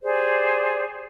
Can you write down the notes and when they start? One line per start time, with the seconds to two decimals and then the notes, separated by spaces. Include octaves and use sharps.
0.03 G4 G#4 C5 D5